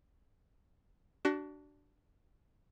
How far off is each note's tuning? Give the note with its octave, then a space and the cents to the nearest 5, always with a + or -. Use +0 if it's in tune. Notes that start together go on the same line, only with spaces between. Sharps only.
D4 +0 F#4 +30